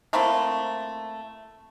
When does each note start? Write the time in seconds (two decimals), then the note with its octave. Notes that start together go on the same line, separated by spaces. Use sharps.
0.13 A3 A#3 C4 E4